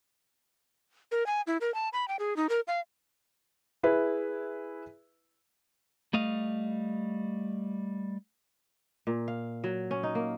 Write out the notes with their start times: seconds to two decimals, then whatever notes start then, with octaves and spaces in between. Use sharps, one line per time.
1.12 A#4
1.26 G#5
1.47 E4
1.61 A#4
1.74 A5
1.93 B5
2.08 G5
2.19 G#4
2.37 D#4
2.49 A#4
2.68 F5
3.83 E4 G#4 B4 E5
6.13 G3 A3 D#5 F5
9.07 A#2
9.28 F5
9.64 F#3
9.91 C#4
10.03 D#4
10.15 A#3